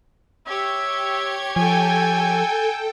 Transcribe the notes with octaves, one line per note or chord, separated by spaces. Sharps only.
G4 C#5 E5 G#6
F3 A4 G5 G#5